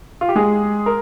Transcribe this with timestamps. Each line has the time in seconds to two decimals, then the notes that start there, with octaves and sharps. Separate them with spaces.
0.21 F4
0.29 G4
0.36 G#3 G#4
0.86 A#4